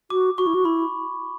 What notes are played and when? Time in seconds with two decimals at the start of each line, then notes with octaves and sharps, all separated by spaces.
0.10 F#4 D6
0.38 F#4 C#6
0.47 E4
0.55 F#4
0.65 E4 B5